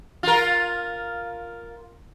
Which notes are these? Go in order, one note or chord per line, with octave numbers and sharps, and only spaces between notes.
F4 A#4